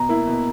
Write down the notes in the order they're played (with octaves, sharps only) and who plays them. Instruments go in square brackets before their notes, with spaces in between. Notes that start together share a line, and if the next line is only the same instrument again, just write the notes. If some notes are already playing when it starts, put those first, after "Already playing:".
Already playing: [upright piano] B2 [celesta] A#5
[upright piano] A#3 E4
B2